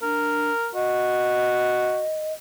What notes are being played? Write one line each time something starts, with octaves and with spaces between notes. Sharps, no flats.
D4 A#4
F#4 D#5